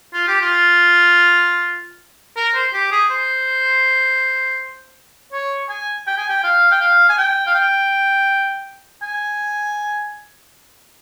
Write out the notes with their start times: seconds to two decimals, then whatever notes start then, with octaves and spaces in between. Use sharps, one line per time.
0.14 F4
0.28 G4
0.41 F4
2.36 A#4
2.55 C5
2.73 G4
2.92 G#4
3.10 C5
5.33 C#5
5.69 G#5
6.07 G5
6.18 G#5
6.29 G5
6.44 F5
6.71 G5
6.81 F5
7.09 G#5
7.17 G5
7.47 F5
7.55 G5
9.02 G#5